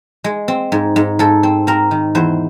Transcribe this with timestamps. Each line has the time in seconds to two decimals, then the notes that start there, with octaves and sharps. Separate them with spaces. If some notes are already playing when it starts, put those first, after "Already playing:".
0.24 G#3
0.48 C4
0.72 G#2
0.96 G#2
1.19 G#2 A4
1.43 C4
1.67 C4 A#4
1.91 D#3
2.15 E2 C5